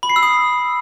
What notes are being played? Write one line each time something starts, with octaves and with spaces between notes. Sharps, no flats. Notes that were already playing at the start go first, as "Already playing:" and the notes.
B5
C7
E6
D#6